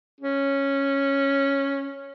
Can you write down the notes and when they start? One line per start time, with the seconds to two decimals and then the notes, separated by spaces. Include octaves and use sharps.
0.20 C#4